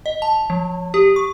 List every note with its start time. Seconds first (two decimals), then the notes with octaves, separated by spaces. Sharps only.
0.06 D#5
0.22 A5
0.50 F3
0.94 G4
1.16 C#6